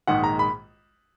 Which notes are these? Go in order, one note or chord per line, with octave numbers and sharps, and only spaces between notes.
A#1 G#2 D#3 G#3 F#5
A#5
B5